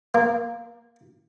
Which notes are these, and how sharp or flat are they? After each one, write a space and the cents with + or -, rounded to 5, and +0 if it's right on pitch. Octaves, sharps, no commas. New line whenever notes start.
A#3 +0